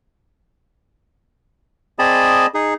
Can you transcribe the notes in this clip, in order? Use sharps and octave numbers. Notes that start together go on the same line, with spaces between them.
C4 G#4 D5 D#5 A5 B5
D#4 G#4